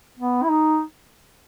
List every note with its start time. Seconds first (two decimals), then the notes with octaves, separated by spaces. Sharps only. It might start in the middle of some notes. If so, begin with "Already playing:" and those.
0.19 B3
0.43 E4
0.49 D#4